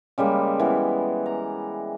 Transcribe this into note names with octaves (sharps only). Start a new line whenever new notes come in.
C#3 G3 G#3 A#3
E3 B3
A#5